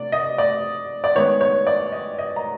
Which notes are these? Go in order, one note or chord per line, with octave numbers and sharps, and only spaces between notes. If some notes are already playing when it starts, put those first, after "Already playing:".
Already playing: C3 A3 D4 D5
D#5
D5
D5
D#3 G#3 B3 C#5
C#5
D5
D#5
D#5
A#5